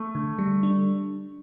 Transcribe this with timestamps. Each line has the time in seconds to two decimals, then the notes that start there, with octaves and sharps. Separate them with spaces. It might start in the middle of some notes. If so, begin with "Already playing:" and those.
Already playing: A3
0.15 D3
0.39 G3
0.63 D4